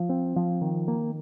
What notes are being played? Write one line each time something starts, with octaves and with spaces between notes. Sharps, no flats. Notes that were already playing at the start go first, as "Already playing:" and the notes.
Already playing: F3
C4
F3
D#3
A#3